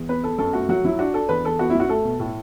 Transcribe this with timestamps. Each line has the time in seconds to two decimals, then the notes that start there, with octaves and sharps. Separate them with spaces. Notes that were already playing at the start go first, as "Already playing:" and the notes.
Already playing: E2
0.09 B3 B4
0.24 B3 A4
0.38 F#2 A4
0.53 A3 F#4
0.69 F#3 F#4
0.84 F#3 E4
0.99 D4 F#4
1.14 D4 A4
1.29 E2 B4
1.45 E2 A4
1.59 B3 F#4
1.70 E4
1.75 F#2
1.80 F#4
1.89 A3 A4
2.04 B2
2.20 A2